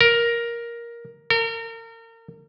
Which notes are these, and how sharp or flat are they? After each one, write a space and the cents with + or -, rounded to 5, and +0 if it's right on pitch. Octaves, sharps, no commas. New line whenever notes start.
A#4 +10
A#4 -35